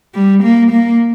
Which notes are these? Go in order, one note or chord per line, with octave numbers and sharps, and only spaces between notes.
G3
A#3
A#3